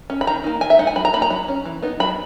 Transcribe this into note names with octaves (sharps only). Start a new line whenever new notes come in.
C#4
B5
D#3 A#5
A#3 D#4
D#3 G#5
E5
G#3 D#4 F#5
G#5
F#3 B5
A#5
A#3 D#4 B5
A#5
F#3 B5
C#4
E3
B3 D#4
F#3 B5